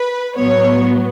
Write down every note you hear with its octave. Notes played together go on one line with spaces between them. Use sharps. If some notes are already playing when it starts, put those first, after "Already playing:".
Already playing: B4
A2 F#3 B3 C#5